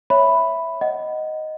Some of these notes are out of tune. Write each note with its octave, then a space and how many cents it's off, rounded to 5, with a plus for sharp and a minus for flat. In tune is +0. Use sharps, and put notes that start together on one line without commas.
C#5 +0 E5 +0 B5 +0
D#5 +0 F#5 +10